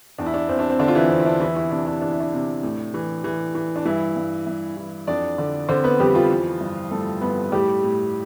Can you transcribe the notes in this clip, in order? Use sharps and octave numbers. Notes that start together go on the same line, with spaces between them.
E2 D4
E4
D4
E2 C4
D4
C4
D3 D4
F4
E3 E4
E2 C4
E4
D4
E3 E4
E3 E4
C3 D4
D4
E2 D4
E4
D4
C3
A2
E3
E3
E3
D4
G2 E3 E4
G2
G2
E3
F2 D4 D5
D3
D3 C4 C5
B3 B4
F2 G3 G4
F3 F4
E3
G2
G2 A3 A4
G2 B3 B4
A2 G3 G4
A2